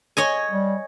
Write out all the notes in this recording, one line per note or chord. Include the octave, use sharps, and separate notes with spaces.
C#5 D#5 G#5
G3